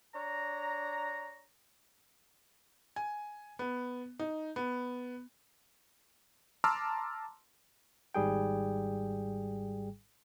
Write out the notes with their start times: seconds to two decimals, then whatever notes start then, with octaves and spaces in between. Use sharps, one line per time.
0.14 D4 C#5 A#5
2.96 G#5
3.59 B3
4.19 D#4
4.56 B3
6.64 A5 A#5 C6 D6 E6 F6
8.15 G#1 G#2 G3 G#4 G5